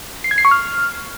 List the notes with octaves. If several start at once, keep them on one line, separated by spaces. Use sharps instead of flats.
C7
G#6
C7
C#6
F6